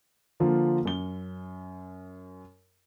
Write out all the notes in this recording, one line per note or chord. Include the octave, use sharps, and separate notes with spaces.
D3 F3 A#3 F4
F#2 G7